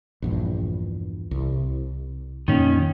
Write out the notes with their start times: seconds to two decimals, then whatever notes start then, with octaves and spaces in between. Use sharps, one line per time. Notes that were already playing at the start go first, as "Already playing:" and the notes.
0.22 A#1 E2 G2
1.31 C2
2.48 F2 A#2 D#3 A#3 C#4